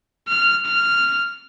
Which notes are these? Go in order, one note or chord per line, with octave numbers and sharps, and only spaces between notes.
F6
F6